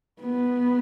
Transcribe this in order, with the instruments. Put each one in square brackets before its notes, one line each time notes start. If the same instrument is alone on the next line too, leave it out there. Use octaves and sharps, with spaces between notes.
[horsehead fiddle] B3